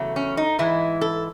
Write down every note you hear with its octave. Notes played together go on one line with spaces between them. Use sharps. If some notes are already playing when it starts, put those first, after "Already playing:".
Already playing: E2 C#3 F#3 A3
C#4
D#4
G#2 E3 G#3 E4
A4